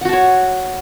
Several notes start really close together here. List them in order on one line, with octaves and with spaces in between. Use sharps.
F#5 F#4 A5 C#5